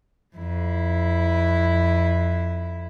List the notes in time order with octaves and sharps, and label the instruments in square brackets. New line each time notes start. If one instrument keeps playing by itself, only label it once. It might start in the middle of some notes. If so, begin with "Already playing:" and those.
[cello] F2 E4